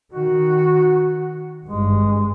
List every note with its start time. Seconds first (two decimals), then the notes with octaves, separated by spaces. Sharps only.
0.14 D#3 F#4
1.66 G#1 G2 G#3